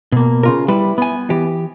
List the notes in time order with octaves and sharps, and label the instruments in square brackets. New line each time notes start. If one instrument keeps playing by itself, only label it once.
[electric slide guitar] B2 A#3
[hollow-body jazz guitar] C#3 F4 A#4
[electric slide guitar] G3 [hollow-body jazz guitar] E4 B4
[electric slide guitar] B3 G#5
[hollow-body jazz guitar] E3 G4